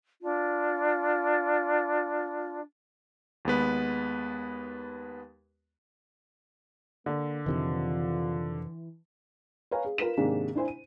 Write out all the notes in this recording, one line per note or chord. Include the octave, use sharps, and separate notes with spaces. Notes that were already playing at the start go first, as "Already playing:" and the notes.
D4 F4
D#2 G#3 B3 B4
D3 A#3
F2 C3 D#3 E3 F4
B4 C#5 F5 G#5 A#5
G#4
F4 A#4 B4 B6 E7
G#2 C3 D#3 G#3 A#3 D4
D4 E4 C5 G#5
D#7